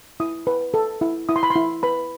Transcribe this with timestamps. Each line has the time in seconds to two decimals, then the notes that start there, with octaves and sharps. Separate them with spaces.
0.20 E4 D#6
0.47 B4
0.74 A4
1.01 E4
1.29 E4 D#6
1.36 C6
1.43 B5
1.50 C6
1.56 E4
1.83 B4 B5